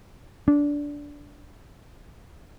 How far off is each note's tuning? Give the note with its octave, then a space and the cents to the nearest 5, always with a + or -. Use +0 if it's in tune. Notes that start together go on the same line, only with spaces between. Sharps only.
D4 -15